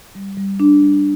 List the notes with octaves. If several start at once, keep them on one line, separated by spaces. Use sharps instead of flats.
G3
G3
D4
G3